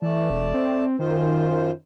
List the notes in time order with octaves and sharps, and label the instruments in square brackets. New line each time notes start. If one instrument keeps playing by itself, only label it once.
[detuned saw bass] E3 [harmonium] A3 D5 A5
[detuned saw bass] E1
C4
[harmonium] F#2 F4 C5 [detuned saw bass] D#3